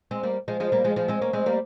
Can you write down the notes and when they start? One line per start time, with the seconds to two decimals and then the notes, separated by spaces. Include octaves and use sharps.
0.11 G#3 C4
0.23 G3 A#3
0.48 F3 G#3
0.60 F3 G#3
0.72 G3 A#3
0.84 F3 G#3
0.96 F3 G#3
1.08 G#3 C4
1.21 A#3 C#4
1.33 G#3 C4
1.46 G3 A#3